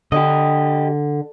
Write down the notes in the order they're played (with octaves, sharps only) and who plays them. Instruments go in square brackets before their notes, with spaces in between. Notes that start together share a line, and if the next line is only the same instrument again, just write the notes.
[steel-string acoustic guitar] D3 [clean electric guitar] G4 D#5